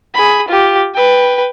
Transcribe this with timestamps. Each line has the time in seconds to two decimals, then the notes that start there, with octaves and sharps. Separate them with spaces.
0.14 G#4 B5
0.49 F4 G4
0.94 B4 G5